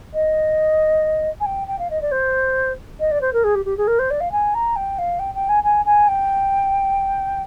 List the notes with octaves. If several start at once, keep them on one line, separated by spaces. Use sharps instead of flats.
D#5
G#5
G5
G5
F5
D#5
D5
C5
D#5
D5
C5
A#4
G#4
G4
G4
G#4
A#4
C5
D5
F5
G#5
A#5
G5
F5
G5
G5
G#5
G#5
G#5
G5